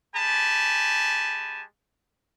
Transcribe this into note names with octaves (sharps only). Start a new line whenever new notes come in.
G#3 G4 G#5 A5 B5